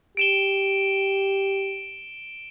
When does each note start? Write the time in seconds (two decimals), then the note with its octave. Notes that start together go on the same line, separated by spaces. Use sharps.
0.17 G4 D7 E7 G7